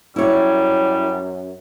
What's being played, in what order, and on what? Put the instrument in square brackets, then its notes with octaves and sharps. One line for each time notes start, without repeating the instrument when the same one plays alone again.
[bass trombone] F#2 [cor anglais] G3 [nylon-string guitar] E4 C#5